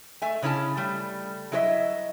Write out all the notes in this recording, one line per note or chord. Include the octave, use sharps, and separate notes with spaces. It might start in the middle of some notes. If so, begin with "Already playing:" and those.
A3 E5 G#5
C#3 C#4 E4 A4 A5
G3 A3
F#3 E4 G#4 C#5 D#5 E5